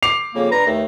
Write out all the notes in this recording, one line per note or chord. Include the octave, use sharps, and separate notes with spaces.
D6 C7 F7
F2 C#3 A#3
G2 B4 A#5
D#2 A3